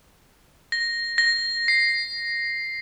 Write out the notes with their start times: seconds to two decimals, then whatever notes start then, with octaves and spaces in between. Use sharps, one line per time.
0.72 A#6
1.18 A#6
1.68 C7